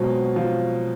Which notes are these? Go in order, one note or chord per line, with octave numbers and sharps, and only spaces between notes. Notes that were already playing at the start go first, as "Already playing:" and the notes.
Already playing: B2 F#3 G#3 C4 F4
F3